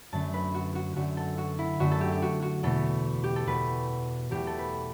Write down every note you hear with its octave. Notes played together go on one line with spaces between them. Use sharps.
F#2 D3 A3 A5
B4
F#4
F#4
F#2 D3 A3 F#4
A4
F#4
E4
F#2 D3 A3 F#4
A4
G4
G4
F#4
F#4
E2 B2 A3 A4
G4
A4
E2 B2 A3 B4
E2 B2 A3 G4
A4
B4